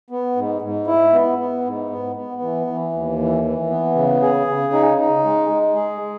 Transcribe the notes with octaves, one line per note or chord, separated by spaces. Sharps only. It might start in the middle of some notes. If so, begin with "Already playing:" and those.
B3
G#2
G#2
E4
B3
B3
G#2
B3
B3
E3
E3
D#2
E3
E3
B3
C#3
G#4
C#3
D#4
D#4
G#3
G#3
G#4
G#3